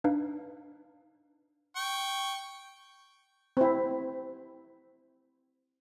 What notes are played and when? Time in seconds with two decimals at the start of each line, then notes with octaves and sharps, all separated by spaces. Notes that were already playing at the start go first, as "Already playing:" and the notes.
0.04 D4 D#4 B4 F5
1.76 G5 C#6
3.57 C4 E4